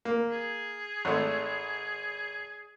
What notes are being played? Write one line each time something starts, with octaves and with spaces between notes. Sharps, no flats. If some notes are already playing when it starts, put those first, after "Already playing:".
A#3
G#4
G#1 A3